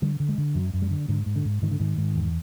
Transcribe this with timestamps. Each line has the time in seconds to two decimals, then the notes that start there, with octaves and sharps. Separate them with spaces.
0.02 D3 G3
0.20 D3
0.29 G#3
0.38 D3
0.55 F#2 F#3
0.73 F#2
0.82 G3
0.91 D3
1.08 G#2 D3
1.26 G#2
1.36 D3
1.45 G#2
1.62 G#2 D#3
1.71 D3
1.80 G#2 D#3
1.97 G#2
2.15 E2